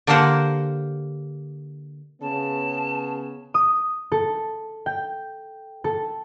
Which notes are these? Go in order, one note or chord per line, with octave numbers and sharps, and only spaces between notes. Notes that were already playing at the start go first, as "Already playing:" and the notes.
D3 A#3 G4 A#4 C5 F#5
C#3 B3 A5
D#6
A4
G5
A4